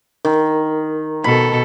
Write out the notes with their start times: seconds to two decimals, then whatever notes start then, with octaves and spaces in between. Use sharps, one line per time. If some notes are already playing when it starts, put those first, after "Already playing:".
0.25 D#3 A#4
1.24 B2 A4 B5